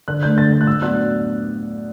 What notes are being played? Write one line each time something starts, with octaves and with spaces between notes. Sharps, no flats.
D3 F#6
A3 D4 G6
D3 A6
A3 D4
F#6
A2 E6
F#3 B3 D4 F#6